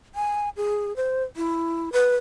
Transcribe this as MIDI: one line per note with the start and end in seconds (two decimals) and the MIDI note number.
0.15 0.49 80
0.57 0.96 68
0.96 1.23 72
1.36 1.92 64
1.92 2.16 71